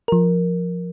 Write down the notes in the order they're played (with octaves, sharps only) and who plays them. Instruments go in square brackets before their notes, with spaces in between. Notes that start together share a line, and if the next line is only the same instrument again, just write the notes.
[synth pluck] F3 A#4